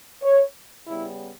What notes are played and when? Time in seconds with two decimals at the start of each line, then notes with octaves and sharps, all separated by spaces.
0.22 C#5
0.86 C#3 G3 B3 E4